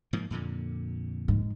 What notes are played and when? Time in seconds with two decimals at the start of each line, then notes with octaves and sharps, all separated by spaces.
0.13 G#2 F3 A#3
0.30 F2 A#2 D3
1.28 G#2